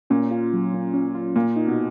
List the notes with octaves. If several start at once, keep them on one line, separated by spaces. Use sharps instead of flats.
A#2 C#4
F4
F#3
A#3
C#4
F4
A#2 A#3
D#4
B2